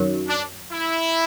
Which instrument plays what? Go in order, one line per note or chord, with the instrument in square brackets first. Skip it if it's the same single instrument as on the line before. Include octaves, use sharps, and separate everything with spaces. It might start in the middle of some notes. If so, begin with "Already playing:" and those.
Already playing: [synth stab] F#2 D#3 F#3
[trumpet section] D4
E4